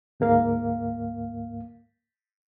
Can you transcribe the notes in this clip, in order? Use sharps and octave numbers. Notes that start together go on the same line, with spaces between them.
D2 G#2 A#3 F5